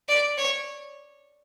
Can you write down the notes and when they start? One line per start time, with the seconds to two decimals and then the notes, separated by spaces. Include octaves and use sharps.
0.09 D5
0.38 C#5